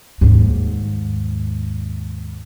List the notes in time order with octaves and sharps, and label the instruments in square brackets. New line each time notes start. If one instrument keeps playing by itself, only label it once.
[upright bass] D#2 G#2